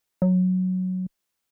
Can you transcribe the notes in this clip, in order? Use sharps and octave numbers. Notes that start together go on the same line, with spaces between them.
F#3